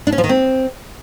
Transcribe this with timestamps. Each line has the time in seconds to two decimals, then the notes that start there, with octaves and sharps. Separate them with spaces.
0.07 D4
0.12 C#4
0.18 F3
0.24 D#3
0.29 C4